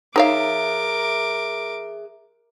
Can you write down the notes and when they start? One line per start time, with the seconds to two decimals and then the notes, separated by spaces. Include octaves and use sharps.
0.16 D#4 G#4 A#4 C#5 E5 F5 D6